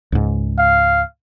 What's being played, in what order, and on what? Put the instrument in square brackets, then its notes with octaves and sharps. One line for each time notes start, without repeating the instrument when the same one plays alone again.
[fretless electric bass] C#2 G#2
[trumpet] F5